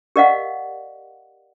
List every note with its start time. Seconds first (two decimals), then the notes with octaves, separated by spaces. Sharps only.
0.16 G4 A#4 D5 D#5 F5 F#5